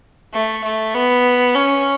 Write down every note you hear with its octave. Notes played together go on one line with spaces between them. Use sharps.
A3
A3
B3
C#4